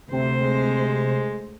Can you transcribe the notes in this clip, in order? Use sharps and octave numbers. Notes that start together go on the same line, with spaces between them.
D2 C3 C5
G#3